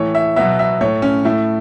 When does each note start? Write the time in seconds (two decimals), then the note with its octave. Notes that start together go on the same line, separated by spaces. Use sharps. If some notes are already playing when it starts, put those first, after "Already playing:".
Already playing: A2 E3 A3 C#5
0.15 E5
0.36 B2 F#3 B3 E5
0.59 E5
0.81 A2 A3 C#5
1.02 C#4
1.25 A2 A3 E4